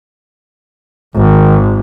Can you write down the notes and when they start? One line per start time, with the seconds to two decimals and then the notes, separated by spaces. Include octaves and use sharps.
1.16 G#1 D#3